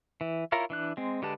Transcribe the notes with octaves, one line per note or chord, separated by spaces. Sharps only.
E3
E4 F4 A#4 C#5 A#5
E3 D4 F#6
G#3 C4
D3 G#3 G4 B4 A5